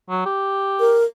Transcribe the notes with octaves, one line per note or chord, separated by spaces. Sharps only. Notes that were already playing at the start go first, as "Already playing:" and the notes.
F#3
G4
A#4